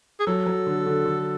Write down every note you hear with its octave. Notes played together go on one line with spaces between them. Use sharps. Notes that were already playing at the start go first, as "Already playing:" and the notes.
G#4
F#3 A4
F#3
D3
D3
D3